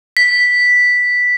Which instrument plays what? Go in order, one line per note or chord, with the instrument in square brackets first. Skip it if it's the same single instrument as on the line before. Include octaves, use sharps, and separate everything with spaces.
[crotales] B6